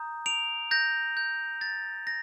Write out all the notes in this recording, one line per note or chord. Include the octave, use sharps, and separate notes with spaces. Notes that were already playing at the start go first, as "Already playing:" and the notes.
Already playing: A#5 D#6 G6
D7 F7
G6 A#6
G6
A6
A#6